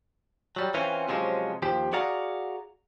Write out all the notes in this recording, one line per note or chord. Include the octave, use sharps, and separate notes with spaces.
F#3 G3
E3 C4 C#4 F4
C3 F3 F#3 G#3 C#4
D#2 F3 G4
F#4 G#4 D5 F5 F#5 A#5